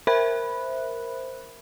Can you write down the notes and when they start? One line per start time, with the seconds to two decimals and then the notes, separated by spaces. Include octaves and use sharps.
0.07 A#4 C5 E5 B5 F#6